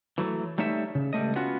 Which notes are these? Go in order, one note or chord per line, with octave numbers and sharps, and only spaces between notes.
E3 F#3 A3
G3 A3 D#4 C#5 E5
C#3
C#2 G3 A3 D#5
B3 C#4 F4 F#4